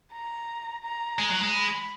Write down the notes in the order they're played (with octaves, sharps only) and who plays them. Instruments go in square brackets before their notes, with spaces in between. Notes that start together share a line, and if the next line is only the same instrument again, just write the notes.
[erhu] A#5
A#5
[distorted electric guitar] G#3
F#3
G#3
[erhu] B5